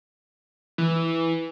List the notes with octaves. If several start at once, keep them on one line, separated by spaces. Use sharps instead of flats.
E3